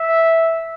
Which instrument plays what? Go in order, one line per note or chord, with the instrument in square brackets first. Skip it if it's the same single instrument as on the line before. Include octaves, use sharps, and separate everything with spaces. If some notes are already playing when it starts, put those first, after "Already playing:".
Already playing: [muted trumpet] E5